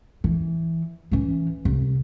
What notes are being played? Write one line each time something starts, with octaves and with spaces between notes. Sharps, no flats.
E3
E3 C#4
C2